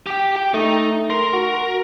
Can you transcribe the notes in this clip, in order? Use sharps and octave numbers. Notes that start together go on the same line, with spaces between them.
G4 G5
G5
A3 D#4
A#4 C6
F#4